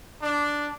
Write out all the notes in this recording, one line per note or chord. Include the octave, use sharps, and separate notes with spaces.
D4